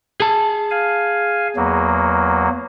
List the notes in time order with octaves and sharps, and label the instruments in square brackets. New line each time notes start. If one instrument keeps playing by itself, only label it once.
[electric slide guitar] G#4 A5
[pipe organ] F5 G#5
E2 F#3 A#3